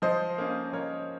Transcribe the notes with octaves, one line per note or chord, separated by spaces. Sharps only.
F3 C5 D#5
A#3 C#4
F3 A#4 C#5